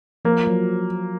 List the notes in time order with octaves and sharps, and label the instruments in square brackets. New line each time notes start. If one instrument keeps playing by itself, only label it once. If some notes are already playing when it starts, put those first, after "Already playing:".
[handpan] F3 [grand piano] A#3
[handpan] F#3